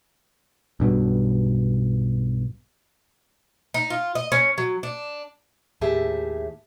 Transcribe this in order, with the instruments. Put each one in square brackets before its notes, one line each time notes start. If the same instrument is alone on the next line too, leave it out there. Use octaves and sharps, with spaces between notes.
[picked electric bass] B1 G2 B2
[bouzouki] D#4
F4
D#5
C#4
F#3
D4
[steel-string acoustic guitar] D#2 A2 G4 G#4 E5 A5